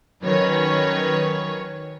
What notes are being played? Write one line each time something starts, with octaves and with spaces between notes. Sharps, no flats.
D#3 F#3 C#4 B4 C#5